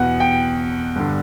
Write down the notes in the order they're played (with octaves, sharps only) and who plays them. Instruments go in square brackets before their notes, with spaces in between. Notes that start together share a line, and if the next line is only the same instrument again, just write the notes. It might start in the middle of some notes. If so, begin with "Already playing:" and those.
Already playing: [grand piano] E2 B2 F#5
G5
G2 D3